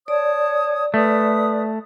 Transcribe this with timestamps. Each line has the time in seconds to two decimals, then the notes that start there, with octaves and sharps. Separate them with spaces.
0.08 C#5 D5 A5 D#6
0.94 A3 B4 D#6